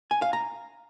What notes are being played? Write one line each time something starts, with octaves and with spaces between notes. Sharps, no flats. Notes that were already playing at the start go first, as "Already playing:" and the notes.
G#5
F5
A#5